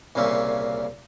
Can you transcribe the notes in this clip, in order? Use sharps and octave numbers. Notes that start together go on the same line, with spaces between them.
C2 A#2 C#3 A#3 C#4 E5